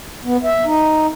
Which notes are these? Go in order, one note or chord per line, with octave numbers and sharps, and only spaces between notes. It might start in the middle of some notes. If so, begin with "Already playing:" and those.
B3
E5
D#4